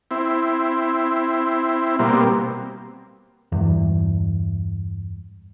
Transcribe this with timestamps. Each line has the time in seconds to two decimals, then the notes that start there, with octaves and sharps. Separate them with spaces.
0.11 C4 E4
1.99 B2 G3 A#3 C4
3.52 E2 G2